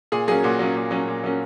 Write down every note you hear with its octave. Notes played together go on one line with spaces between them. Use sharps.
A#2 G#4
F#3 A#3 C#4 G#4
A#2 F#4
F#3 A#3 C#4
A#2
F#3 A#3 C#4
A#2
F#3 A#3 C#4